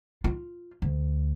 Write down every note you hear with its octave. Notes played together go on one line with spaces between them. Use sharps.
F4
D2